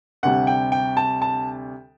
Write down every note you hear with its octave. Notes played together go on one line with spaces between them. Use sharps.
D2 C3 G3 F#5
G5
G5
A5
A5